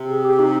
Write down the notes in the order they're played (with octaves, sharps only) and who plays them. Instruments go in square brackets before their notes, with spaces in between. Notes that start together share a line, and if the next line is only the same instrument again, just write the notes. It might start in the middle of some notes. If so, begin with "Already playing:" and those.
Already playing: [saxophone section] C3
[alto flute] G#4
G4
D#4